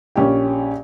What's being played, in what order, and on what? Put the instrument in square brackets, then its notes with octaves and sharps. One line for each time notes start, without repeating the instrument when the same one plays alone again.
[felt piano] A#1 C#4 G4 G5